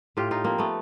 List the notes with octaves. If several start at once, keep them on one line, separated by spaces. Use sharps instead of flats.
A2 F4 G4
D#4 F4
F3 A#3 C4
A3 B3